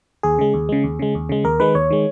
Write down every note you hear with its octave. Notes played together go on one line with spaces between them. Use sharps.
D#2 G#4
C#3 G#3
D#2
C#3 G#3
D#2
C#3 G#3
D#2
C#3 G#3
D#2 A#4
D#3 G#3 B4
D#2 C#5
D#3 G#3